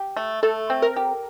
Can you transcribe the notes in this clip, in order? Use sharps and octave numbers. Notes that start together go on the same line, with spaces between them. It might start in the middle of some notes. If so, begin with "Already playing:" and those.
Already playing: G4
A3
A3 A4
C4
A#4
G4